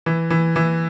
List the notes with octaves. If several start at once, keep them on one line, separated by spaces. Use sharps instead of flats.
E3
E3
E3